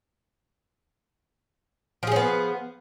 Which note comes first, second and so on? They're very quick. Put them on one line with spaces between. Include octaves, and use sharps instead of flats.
F3 G#4 C#4 B3